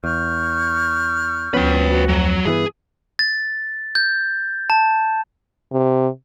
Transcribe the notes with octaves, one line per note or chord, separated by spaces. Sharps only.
E2 C#6 F6 G6
D2 F3 B3 C#4 B4 G5
F#4
F2 F#3
G2 E3 B3 G#4
A6
G6
A5
C3